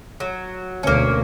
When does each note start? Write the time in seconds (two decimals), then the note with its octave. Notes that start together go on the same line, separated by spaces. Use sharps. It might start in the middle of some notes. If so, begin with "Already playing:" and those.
0.20 F#3
0.83 D2 B2 A#3 C#4